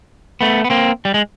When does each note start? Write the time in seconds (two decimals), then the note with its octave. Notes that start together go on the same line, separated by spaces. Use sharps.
0.41 A3 B3
0.64 B3
0.70 A#3 C4
1.05 G3
1.14 G#3